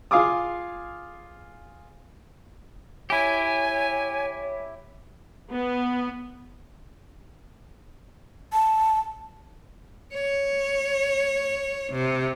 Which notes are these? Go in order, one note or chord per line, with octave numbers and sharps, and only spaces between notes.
F4 G#4 F5 G#5 D6 D#6
E4 G4 C#5 G#5
B3
A5
C#5
C3